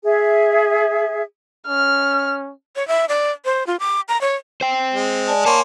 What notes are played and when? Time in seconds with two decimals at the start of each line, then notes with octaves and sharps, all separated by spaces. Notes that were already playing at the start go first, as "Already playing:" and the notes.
0.05 G#4 E5
1.68 C#4 F6
2.75 C#5
2.88 E5
3.09 D5
3.45 C5
3.67 F4
3.80 D6
4.09 A#5
4.21 C#5
4.61 C5 G5
4.94 G#3
5.28 D5 G#5 A5
5.45 A#3 C#5 G#5 A5 C6 C#6